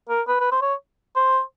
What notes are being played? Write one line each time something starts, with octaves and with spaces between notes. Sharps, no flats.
A#4
B4
B4
C5
C#5
C5